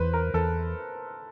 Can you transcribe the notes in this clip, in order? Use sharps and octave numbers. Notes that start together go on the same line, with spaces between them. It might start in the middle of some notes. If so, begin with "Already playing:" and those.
Already playing: E2 B4 C5
A#4
E2 A4